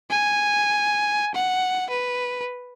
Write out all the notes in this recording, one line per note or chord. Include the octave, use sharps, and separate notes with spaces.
G#5
F#5
B4